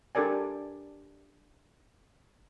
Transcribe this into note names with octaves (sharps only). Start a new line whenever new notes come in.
D4 G4 A4 A#4 D5 G#5